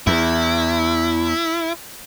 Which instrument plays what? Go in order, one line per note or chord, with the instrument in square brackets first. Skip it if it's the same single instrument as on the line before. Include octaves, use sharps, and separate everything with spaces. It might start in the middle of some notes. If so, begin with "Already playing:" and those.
[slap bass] E2 [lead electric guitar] E4